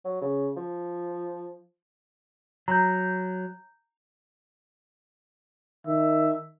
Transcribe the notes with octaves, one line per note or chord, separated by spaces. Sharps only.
F#3
C#3
F3
F#3 A#5 G6
D#3 E5